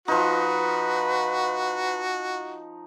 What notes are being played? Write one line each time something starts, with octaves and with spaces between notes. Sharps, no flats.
F3 D#4 F#4 B4